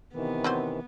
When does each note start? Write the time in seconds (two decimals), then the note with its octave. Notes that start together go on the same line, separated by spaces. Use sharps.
0.14 C3 D#3 E3 B3
0.44 F#3 C4 C5